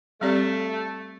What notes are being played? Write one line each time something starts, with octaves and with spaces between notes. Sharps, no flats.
G3 A3 C4 G4 D5